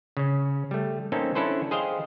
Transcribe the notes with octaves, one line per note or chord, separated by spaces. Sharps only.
C#3 C#4
G3 A3
A#3 C4 C#4 D#4 A4
C#4 D4 E4 A4 B4 C5
G#4 C5 D#5 F5 G5